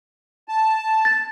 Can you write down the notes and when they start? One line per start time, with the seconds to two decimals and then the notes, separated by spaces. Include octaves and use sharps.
0.48 A5
1.05 A6